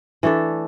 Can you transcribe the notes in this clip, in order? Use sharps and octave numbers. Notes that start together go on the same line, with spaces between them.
E3 A3 D4 A4